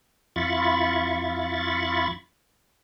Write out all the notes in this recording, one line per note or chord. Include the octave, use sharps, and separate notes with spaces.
F2 E4 F4 B5 C#6 A6